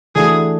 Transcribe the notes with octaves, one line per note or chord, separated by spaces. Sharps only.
E3 A3 D4 F#4 G#4